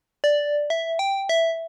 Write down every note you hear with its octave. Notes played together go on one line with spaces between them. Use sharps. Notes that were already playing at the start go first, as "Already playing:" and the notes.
D5
E5
G5
E5